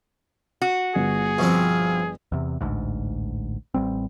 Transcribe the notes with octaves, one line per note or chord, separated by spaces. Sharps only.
F#4
G1 G#4
B2 F3 C4
E2 C3
A1 D2 G#2
A1 G3 C4